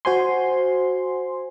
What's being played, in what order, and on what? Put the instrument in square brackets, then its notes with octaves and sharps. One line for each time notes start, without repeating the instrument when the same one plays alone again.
[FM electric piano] F#4 C5 G#5 C6